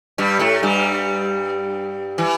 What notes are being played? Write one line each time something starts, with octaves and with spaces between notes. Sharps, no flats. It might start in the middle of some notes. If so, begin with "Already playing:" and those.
G2 G3
A2 A3
G2 G3
E3